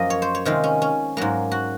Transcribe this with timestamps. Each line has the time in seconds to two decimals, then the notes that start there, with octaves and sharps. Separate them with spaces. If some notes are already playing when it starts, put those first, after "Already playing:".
Already playing: F#2 F3 A#3 D#5
0.10 C#5
0.22 C5
0.35 C#5
0.45 C3 D#3 G#3 F4
0.64 C#4
0.82 C#4
1.17 G#2 F#3 A#3
1.51 F#4